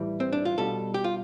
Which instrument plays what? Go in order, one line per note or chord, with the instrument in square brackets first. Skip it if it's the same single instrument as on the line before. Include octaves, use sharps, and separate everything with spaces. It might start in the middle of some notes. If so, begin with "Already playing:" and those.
Already playing: [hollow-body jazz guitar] A2 E3 G3
C4
D4
F4
B2 G3 A4
G4
F4